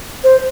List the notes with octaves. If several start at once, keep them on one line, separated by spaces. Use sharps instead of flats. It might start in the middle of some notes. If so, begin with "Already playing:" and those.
C5